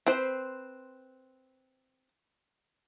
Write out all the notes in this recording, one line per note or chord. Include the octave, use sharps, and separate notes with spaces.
C4 B4 C5